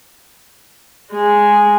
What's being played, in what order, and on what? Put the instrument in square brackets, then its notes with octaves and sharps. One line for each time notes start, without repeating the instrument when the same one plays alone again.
[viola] G#3 G#4